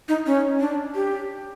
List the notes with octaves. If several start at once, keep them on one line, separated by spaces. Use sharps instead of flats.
D#4
C#4
D4
G4